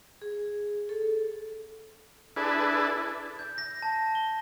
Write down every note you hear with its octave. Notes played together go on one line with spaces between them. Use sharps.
G#4
A4
D4 E4 G#4 A4 B4
G6
A#6
A5
G7